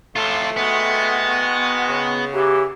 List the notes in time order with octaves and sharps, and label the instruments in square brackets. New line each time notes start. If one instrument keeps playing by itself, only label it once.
[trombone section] A1 [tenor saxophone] A3 [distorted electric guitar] F4 A4
[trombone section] D#3 G#3 F#4 [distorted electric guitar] B3
[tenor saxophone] C#3
[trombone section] E3 F#3 [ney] G4